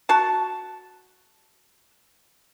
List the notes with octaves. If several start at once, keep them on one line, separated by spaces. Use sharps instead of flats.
F#4 A5